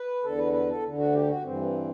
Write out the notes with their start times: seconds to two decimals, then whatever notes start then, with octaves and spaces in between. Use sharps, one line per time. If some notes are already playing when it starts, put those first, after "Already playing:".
Already playing: B4
0.24 E2 D3 A4
0.38 B4
0.53 B4
0.68 A4
0.83 D2 D3
0.98 F#4
1.13 G4
1.27 F#4
1.42 G2 E3 C4